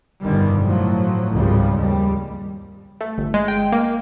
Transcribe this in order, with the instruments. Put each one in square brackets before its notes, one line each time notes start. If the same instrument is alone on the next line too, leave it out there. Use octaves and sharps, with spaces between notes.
[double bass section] G1 F2 B2 D3 D#3 G3
A2 F3 F#3
G#1 C#2 C#3 F3 G3
D#2 G3
[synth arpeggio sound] A3
G1
G#3
G5
A#3